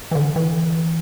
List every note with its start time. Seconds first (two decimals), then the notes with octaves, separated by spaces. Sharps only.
0.11 E3
0.15 D3
0.36 E3